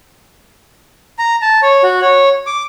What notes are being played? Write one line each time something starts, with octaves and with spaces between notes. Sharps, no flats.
A#5
A5
C#5
F#4
C#5
D6